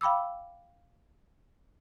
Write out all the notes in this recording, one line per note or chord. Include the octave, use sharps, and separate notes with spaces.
F5 G5 B5 D6 E6